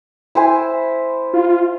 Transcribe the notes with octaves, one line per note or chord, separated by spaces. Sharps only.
E4 C5 G#5
F4